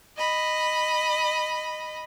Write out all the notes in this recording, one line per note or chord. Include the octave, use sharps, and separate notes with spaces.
D#5 B5